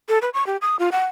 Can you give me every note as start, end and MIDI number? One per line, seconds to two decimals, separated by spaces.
0.09 0.18 69
0.22 0.30 71
0.34 0.46 85
0.46 0.57 67
0.61 0.76 87
0.79 0.89 65
0.92 1.05 78